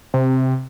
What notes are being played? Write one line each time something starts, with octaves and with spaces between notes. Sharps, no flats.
C3